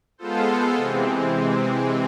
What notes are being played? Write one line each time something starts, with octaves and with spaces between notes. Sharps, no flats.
G#3 B3 F4 A4 C5
C3 E3 G#3 C4